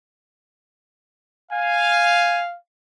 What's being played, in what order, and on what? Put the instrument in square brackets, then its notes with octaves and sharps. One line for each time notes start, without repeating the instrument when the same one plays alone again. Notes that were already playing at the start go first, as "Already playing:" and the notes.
[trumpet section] F5 [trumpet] G#5